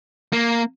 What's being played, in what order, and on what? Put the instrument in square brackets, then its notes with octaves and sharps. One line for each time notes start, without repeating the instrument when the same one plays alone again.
[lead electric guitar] A#3